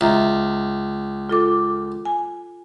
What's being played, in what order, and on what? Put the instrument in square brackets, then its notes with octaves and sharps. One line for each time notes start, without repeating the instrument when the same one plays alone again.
[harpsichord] C#2 [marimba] E5 A#5
[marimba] F4 A4 D6
G#5